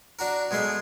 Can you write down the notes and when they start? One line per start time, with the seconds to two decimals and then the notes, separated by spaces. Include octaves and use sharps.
0.19 D4 F#4 A#4
0.51 B2 G#3 A3 C6